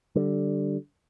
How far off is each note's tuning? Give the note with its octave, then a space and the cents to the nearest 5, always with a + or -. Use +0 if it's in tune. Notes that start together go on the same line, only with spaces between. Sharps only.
D3 +0 G3 -15